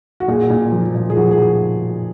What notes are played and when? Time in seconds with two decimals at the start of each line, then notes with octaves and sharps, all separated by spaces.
0.20 F#4
0.28 A#2 G#4
0.50 A#2
0.72 F3
0.95 A#2
1.10 G#4
1.17 F3 F#4
1.31 G#4